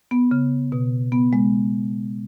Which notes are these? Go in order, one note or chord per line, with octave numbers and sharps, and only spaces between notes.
B3
C#3
B2
B3
G#3